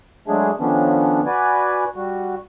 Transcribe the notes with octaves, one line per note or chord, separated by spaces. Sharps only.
F#3 G#3 A3 D4 G#4
D3 D#3 F3 B3 C#4 D4
F#4 B4 D5 G#5
G3 F#4